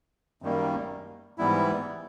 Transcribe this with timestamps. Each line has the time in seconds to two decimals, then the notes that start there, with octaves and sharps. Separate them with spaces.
0.42 F#2 D#3 G3 A#3
1.38 G#2 E3 G3 B3 E4